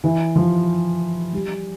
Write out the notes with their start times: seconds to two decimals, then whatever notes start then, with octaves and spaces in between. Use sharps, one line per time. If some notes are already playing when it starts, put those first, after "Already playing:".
0.04 E3
0.36 F3
1.33 G3